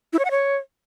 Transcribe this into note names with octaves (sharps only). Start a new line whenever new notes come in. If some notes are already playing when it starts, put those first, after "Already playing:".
E4
C#5
F#5
C#5